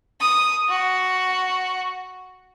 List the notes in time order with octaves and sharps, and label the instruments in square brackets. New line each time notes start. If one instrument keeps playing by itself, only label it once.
[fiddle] D#6
F#4